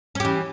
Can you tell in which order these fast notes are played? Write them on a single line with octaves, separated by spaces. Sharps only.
C#4 G4 E3